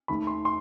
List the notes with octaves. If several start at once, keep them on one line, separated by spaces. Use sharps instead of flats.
D#2 D#3 A3 B5
C6
C6